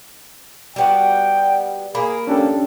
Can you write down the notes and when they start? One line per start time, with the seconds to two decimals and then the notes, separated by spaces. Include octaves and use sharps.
0.76 G3 B3 F#4 G5
1.95 A#3 G#4 B5
2.27 C#4 D4 G4 A4